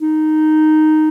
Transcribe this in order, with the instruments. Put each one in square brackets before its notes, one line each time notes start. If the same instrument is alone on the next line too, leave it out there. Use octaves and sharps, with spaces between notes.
[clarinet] D#4